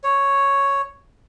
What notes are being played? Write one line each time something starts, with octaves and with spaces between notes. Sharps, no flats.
C#5